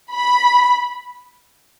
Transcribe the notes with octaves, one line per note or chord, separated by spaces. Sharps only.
B5